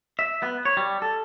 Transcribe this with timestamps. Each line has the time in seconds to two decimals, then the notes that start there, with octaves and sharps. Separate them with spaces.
0.19 E5
0.43 B3
0.65 C#5
0.77 G3
1.02 A4